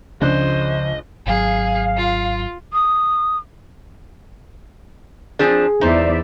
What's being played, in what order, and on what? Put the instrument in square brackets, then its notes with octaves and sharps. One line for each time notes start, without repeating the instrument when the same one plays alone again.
[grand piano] C#2 D4 F#6 [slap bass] C#3 F3 [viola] C5 [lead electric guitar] D#5
[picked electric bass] G#1 F#3 [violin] G#4 [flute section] F5
[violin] F4
[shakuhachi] D#6
[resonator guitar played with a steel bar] F3 C4 D4 [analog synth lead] G#4
[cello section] E2 D5 E5 [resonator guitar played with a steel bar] D#4 C5